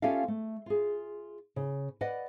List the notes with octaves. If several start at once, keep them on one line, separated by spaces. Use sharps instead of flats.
C#4 F4 G4 A4 E5 F5
A3
F4 G#4
C#3
B4 D5 D#5 F#5